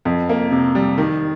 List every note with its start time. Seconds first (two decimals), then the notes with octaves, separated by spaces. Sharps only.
0.05 F2
0.29 A#3
0.52 C3
0.75 G3
0.98 D#3